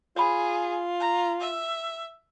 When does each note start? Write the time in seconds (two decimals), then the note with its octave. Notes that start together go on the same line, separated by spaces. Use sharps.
0.16 F4 G#4 C#5 B5
1.00 A#5
1.41 E5